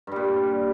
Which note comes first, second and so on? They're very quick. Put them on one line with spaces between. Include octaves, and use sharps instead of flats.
G2 G3 A#2